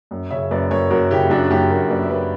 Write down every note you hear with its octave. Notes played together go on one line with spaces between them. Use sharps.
F#2
C#3 C#5 E5
F#2 B4 D5
F#2 A#4 C#5
F#2 F#4 A#4
C#3 E4 G4
F#2 D4 F#4
F#2 E4 G4
F#2 F#4 A#4
F#2 B4 D5
E5
F#2 B4 D5